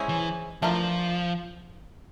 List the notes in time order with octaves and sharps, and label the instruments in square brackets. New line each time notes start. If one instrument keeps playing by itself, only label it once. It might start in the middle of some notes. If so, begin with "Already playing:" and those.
Already playing: [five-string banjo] G#3 C#4 E4 G#4 C5
[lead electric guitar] E3
[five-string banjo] E3 A3 D4 F4 A#4 [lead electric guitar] F3